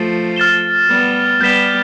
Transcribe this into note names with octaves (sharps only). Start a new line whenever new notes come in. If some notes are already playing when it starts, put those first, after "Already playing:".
Already playing: F3 A3
F6 A6 E7 G7
G3 B3
G3 B3 G6 B6 E7 G7